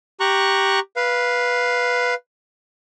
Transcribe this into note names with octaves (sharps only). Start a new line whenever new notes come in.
G4 A#5 C#6 F#6
B4 F5